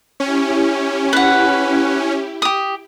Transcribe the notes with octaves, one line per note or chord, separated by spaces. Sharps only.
C#4 E4 G4
B4 F#5
G4 D#6